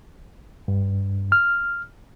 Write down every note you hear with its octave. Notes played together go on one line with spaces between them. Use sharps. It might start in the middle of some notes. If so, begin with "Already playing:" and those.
G2
F6